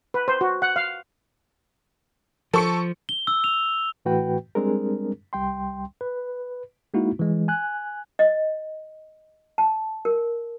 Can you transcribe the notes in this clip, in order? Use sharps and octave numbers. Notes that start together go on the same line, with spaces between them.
B4
C5
F#4
F#5
F5
F3 A4 C#6 C#7
G7
E6
F7
A2 E3 A3 F#4 B4 G5
G3 G#3 C4 D4 G#4 A#4
C2 G3 G5 C6
B4
G#3 A#3 D#4 E4 F#4
E3 G#3
G#5 F#6
D#5
A5
A#4